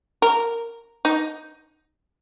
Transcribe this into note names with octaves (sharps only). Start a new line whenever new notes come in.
A#4
D#4